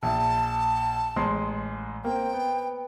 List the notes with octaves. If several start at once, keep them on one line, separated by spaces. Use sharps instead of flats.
A#1 E5 A5
A1 G#3 C6
A#3 C4 G5
B3